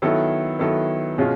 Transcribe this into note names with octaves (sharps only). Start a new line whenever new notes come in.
D#3 F#3 B3 E4 A4
D#3 F#3 B3 E4 A4
B2 G#3 C#4 F4